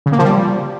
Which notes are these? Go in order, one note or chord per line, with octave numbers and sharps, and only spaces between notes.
C#3
A#3
F3
G3